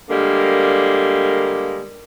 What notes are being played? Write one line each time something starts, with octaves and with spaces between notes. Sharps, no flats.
D3 G3 G#3 A#3